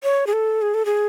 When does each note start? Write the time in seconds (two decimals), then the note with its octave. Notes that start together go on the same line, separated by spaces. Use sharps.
0.03 C#5
0.27 G#4
0.33 A4
0.62 G#4
0.74 A4
0.86 G#4